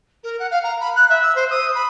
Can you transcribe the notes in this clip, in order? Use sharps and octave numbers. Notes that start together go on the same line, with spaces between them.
A#4
F#5
F5
A#5
B5
F#6
E5
E6
C5
D#6
B5